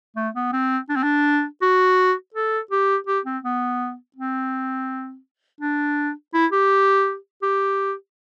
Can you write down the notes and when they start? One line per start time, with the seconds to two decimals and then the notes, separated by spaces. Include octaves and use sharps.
0.16 A3
0.35 B3
0.53 C4
0.89 D4
0.96 C4
1.03 D4
1.62 F#4
2.34 A4
2.71 G4
3.07 G4
3.25 C4
3.44 B3
4.16 C4
5.61 D4
6.34 E4
6.52 G4
7.43 G4